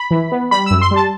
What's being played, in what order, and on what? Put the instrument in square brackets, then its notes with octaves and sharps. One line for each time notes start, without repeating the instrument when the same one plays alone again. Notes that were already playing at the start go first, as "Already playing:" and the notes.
Already playing: [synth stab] B5
E3
B3
G3 B5
F#2 E6
C6
G3 A5